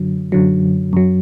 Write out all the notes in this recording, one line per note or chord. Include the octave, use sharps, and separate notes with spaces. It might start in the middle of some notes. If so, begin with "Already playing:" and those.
Already playing: F#2 D3 F#3
F#2 D3 F#3
F#2 F#3